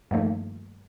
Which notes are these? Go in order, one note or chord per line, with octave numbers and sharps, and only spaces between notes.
G2 D#3 F3 A3 A#3